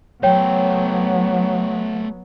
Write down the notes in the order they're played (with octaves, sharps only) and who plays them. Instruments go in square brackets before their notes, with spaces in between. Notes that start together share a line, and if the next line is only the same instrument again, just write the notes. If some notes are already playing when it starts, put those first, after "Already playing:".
[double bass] F#3 B3 [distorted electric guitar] A3 C5 [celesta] C#5 G5